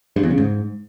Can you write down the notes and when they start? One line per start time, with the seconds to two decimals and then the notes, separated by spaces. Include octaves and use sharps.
0.16 G2
0.23 E2
0.31 C#3
0.38 G#2